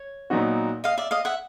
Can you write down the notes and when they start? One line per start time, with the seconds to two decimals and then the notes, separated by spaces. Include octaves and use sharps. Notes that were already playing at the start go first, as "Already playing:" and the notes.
Already playing: C#5
0.30 A#2 F#3 B3 D#4 F#4
0.84 D#5 F5
0.98 D5 E5
1.11 D#5 F5
1.25 E5 F#5